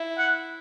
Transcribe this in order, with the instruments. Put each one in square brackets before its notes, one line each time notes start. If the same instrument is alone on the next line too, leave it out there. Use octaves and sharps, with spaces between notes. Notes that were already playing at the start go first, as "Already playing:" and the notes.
Already playing: [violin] E4
[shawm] F#5